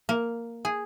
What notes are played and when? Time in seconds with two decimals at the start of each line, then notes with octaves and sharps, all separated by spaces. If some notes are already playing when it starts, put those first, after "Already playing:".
0.09 A#3
0.65 G#4